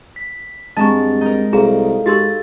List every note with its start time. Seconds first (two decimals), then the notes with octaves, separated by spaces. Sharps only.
0.16 B6
0.77 G2 G#3 C4 G#4 A5 A#5 C#6 A6
1.21 D#4 A#4
1.53 C2 F#4 G#4 A4 F5 A#5
2.06 G#2 F#4 G4 C6 E6 G#6 A6